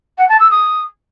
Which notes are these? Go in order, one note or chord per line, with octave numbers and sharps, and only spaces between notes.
F#5
A5
E6
D#6